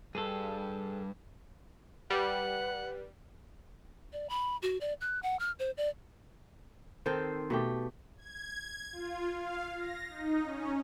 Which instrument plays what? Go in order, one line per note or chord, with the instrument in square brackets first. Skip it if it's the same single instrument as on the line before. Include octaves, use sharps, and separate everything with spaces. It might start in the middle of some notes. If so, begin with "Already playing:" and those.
[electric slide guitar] G2 [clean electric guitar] G#4 A4
[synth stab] G3 [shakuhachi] B4 [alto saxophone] F#5
[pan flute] D5
B5
F#4
D5
F#6
F#5
F6
C5
D5
[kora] D#3 C4 A4 C5
B2 A3 G4
[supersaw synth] G#6
G#6
F4
F5
A#6
D#4
C#4